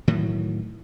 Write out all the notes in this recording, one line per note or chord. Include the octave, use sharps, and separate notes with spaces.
A2 D#3 E3 F#3